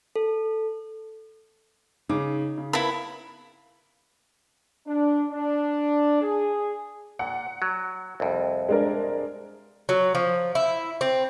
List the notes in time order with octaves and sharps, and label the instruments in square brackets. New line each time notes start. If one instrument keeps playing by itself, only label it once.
[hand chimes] A4
[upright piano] C#3 G#4 D6 [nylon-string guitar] D#4
[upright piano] C#3
[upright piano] B3 A#4 F5 [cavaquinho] E4 B5
[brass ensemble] D4
D4
G#4
[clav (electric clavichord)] A#2 [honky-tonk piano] F#5
[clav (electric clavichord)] F#3
C2 F2
[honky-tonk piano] G#3 D4 A#4
[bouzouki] F#3
F3
E4
C4